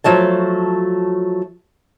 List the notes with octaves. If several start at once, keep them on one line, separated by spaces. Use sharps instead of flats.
F3 F#3 A3 A5